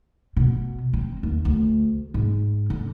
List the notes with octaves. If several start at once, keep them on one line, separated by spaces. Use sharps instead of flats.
B2
C4
D#2
D2
G#2
D3